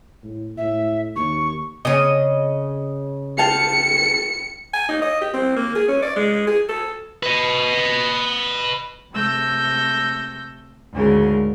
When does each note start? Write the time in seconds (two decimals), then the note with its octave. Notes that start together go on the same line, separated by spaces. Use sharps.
0.24 A2
0.57 A2 E5
1.16 D#2 C#6
1.85 C#3 C#4 D#5
3.38 F5 G5 A5 C#7
4.73 G#5
4.89 D#4
5.02 D#5
5.21 G4
5.33 C4
5.56 A#3
5.75 G#4
5.88 C#4
6.02 D5
6.16 G#3
6.47 G#4
6.69 A4
7.23 B4 D#5
9.13 C3 A3 E6 G6 A#6
10.93 D2 G#2 C#3 A#4